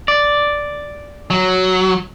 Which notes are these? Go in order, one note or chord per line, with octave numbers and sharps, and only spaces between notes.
D5
F#3